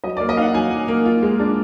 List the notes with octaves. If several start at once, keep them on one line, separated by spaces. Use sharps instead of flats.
F#3 D#5
D5
A#3
D#5
D#4 F5 F#5
F#3 G#5
F#3
A#3
F4
G#3
D4